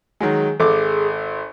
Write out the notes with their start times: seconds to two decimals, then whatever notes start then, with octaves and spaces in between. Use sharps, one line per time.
0.20 D#3 F#3 G#3 G#4
0.60 G#1 A4 D6